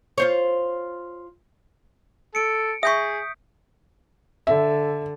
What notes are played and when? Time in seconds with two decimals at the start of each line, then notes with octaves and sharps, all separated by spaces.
0.18 F4 C5 C#5
2.35 A4 C#7 D7
2.83 G#4 E5 C#6 D#6 G6 B6
4.47 D3 E5